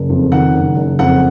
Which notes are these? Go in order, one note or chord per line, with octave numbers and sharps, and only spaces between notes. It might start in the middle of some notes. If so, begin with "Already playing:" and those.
Already playing: F#1
F2
D#3 F#5
F#1
F#1
F2 F#5